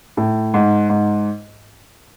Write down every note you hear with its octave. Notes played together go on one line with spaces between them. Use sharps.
A2
G#2
G#2